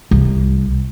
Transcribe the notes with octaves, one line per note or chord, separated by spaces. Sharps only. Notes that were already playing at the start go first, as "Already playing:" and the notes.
C2